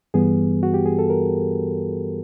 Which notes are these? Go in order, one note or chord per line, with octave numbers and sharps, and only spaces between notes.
G2 E3 G3 B3 G#4
F#4
G4
G#4
A4
A#4